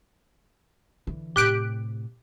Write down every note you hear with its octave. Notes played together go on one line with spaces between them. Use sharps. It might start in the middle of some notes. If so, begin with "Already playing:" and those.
D3 E3
A2 C3 G4 F#6 D7